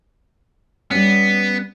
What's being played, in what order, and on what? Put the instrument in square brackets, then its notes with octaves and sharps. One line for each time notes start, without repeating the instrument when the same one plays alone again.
[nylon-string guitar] G3 C#4 [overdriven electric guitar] B3